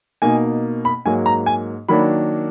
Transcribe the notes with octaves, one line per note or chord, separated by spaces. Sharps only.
B2 A#3 D#4 G#5
B5
G#2 F#3 A#3 G#5
A#5
G#5
D#3 F#3 A#3 D4 B5